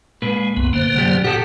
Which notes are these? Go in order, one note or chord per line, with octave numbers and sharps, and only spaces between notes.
A#2 G#3 B4
C2 F#2 B3
D3 A#3 C5
C2 F#2 G3
A#2 G4 A4 F#5